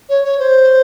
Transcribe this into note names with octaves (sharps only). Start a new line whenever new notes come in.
C#5
C#5
C5